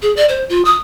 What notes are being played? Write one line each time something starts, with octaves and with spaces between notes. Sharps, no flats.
G#4
D5
C5
F4
D#6